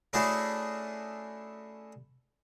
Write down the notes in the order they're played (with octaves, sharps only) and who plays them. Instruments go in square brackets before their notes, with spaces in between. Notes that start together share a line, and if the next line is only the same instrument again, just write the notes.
[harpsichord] A3 C#4 D4 E4 F#4 G#4